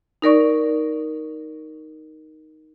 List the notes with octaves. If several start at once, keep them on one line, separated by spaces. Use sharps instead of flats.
D#4 A#4 D5 C#6